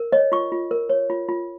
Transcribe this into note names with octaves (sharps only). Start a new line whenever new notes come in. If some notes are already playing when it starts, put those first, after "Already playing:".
Already playing: A#4
C#5 D#5
F4 C#6
F4
A#4
C#5
F4
F4